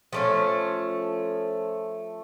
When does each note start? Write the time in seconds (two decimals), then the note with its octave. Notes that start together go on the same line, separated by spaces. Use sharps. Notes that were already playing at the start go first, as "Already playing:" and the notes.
0.13 F3 A3 C#4